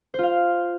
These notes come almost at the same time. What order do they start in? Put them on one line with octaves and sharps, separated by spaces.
C5 F4 F5